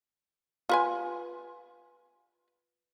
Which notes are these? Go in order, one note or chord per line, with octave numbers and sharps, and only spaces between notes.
F4 B4 G#5